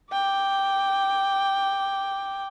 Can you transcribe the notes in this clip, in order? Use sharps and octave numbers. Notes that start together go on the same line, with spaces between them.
G5 D6